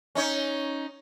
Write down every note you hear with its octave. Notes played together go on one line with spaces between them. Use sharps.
C#4 D#4 C#5